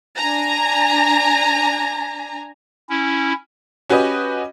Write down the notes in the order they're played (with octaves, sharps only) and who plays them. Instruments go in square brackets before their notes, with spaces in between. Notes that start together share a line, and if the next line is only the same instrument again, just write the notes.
[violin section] D4 G#5 A#5
[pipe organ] C#4 E4
[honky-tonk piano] C#4 F#4 G4 B4 D#5